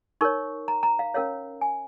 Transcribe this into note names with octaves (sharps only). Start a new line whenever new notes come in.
D#4 A#4 C#5 C#6
A#5
A#5
F5
C#4 A#4 C#5 F5
G#5